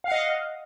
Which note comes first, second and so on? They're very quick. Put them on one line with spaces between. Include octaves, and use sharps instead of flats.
F5 F#5 D#5